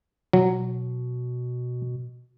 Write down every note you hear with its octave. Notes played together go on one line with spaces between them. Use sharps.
B2 F#3